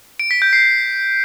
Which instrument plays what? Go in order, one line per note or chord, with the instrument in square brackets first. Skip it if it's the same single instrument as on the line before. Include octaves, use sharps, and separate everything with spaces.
[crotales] D7
B6
G6
C7